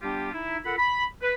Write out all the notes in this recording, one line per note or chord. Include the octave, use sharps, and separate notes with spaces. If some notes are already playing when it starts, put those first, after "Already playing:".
G3 B3 D4 F4 G4
D#4 E4
F4 A4 A#4 F#5 B5
B5
B4